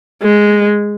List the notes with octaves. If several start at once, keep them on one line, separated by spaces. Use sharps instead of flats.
G#3